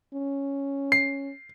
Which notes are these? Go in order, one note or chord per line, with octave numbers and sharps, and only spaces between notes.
C#4
C7